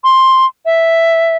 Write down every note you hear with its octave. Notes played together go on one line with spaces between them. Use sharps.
C6
E5